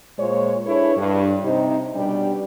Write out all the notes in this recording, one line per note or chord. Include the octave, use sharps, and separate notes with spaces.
A#2 G#3 F4 C5 C#5
D4 E4 G#4 A4 B4 C#5
G2
C3 C4 D#4
B2 G3 B3 C#4 D4 G4